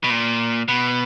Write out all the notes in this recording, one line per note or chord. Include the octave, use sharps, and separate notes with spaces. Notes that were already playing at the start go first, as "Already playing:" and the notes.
B2
A#2
B2